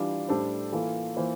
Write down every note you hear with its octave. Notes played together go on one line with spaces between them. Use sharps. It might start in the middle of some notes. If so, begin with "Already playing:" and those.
Already playing: E3 G3 D4 F4
A2 G3 D4 A4 C5
E3 A#3 F4 A4
E3 A#3 F4 C5